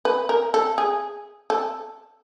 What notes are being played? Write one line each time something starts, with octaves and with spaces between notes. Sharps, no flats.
B4
A#4
A4
G#4
A4